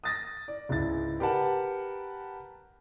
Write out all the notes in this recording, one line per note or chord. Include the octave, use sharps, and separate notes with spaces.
D#6 A6 A#6
D5
C#2 G#2 E4 A6
G4 A#4 B4 F#5 A5